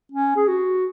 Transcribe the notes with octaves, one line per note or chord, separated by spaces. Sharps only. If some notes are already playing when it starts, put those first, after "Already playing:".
C#4
G#4
F#4